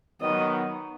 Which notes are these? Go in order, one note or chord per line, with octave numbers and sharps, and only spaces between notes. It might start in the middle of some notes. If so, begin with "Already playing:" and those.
D#3 F#3 B3 D#4 F#4 D#5